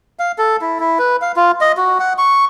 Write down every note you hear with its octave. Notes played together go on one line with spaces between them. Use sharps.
F5
A4
E4
E4
B4
F5
F4
D#5
F#4
F#5
C#6